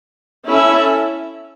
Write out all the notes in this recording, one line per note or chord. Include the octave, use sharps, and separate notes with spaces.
C#4 E4 A4 E5